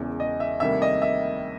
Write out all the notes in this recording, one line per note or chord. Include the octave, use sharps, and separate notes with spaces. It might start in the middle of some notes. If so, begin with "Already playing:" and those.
Already playing: E1 E2 C#3 E3
D#5
E5
D2 C3 D#3 G3 A#3 E5
D#5
E5